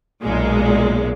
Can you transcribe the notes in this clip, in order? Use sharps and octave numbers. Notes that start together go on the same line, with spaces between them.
B1 A#2 G#3